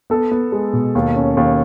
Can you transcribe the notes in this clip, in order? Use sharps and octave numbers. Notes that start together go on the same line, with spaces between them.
B3 A4
B3
G#3
B2
D#2
C#4
D#2